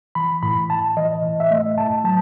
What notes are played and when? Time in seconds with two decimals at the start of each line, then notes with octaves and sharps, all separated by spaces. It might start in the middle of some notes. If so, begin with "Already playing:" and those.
0.15 E3 B5
0.43 A2 B5
0.70 A2 A5
0.97 E3 D#5
1.23 A2
1.40 E5
1.51 A3 D#5
1.78 A2 A5
2.04 F#3 A5